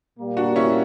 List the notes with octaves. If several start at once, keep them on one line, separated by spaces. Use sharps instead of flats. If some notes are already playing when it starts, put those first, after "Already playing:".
A#2 G3 A#3
D4 F#4
C#4 E4